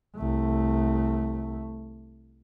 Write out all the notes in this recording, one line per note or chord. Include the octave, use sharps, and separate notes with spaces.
C2 A3